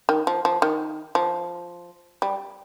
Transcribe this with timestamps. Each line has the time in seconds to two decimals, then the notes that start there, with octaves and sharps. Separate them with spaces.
0.09 D#3
0.27 F3
0.45 F3
0.62 D#3
1.15 F3
2.22 G3